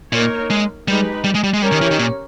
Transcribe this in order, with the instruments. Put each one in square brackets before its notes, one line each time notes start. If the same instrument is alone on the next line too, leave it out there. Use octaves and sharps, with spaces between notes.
[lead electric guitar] A#2 [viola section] A#3 D#4 A#4 C#5
[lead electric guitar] G#3
[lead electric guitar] G3 [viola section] G#3 D#4 G4 B4
[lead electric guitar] G3
G#3
G3
G#3
[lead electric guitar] G3 [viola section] C#4 G4 A#4 C#5
[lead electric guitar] D#3
E3
D#3
A#2